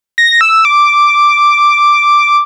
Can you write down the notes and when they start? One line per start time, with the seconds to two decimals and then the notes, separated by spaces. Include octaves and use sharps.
0.18 A#6
0.41 E6
0.65 D6